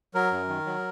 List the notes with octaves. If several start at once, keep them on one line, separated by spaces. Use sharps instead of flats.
F#3 A#4
F#2
D#3
F#3